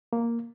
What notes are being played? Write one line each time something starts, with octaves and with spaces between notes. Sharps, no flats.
A#3